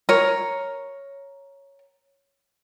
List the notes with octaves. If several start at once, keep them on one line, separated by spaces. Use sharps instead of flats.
A#4 C#5